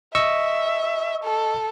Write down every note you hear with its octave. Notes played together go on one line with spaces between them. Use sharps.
D#5 E5 C#6 E6
A4